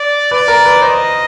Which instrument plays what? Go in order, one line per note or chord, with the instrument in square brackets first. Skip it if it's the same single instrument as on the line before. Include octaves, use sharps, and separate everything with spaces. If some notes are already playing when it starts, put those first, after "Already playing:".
Already playing: [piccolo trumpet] D5
[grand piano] B4 [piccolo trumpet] D5
[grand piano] A#4
B4
[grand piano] C5 [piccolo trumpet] D#5